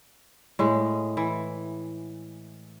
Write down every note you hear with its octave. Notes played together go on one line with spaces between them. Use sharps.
A2 G#3
E3